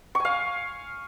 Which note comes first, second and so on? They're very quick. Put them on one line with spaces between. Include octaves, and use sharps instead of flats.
C#6 G#5 F5